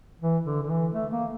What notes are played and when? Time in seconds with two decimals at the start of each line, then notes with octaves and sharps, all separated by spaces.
0.21 E3
0.45 D3
0.63 D3
0.69 E3
0.94 A3
1.12 A#3